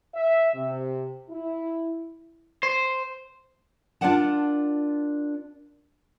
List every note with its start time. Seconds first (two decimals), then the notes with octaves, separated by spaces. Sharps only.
0.15 E5
0.54 C3
1.29 E4
2.63 C5
4.01 D4 F4 A#4 D5 F#5 A5